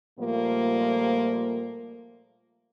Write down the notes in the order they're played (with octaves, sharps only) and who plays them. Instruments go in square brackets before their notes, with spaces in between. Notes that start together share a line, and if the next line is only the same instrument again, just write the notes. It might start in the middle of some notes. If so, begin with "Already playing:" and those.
[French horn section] A#2 F3 G3 A3 A#3